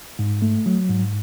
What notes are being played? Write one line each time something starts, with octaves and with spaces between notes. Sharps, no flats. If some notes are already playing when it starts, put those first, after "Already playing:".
G#2
A3
F#3
G#2